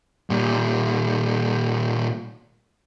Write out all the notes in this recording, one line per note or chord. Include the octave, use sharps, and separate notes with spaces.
A#2 G3